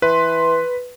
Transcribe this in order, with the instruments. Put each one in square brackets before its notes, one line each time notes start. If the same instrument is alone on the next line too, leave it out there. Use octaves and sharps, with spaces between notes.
[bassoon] E3 [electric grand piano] B4 [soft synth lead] C6